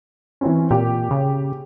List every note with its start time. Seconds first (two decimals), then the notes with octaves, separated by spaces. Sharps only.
0.41 E3 C4 C#4
0.71 A#2 G4
1.11 C#3